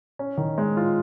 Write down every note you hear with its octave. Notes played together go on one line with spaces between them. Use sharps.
C#4
D#3
G#3
F4